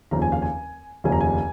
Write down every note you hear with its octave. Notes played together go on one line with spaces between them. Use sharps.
F1 D#2 C#3 F3 A#5
G#5
F5
G#5
F1 D#2 C#3 F3 G#5
A#5
G#5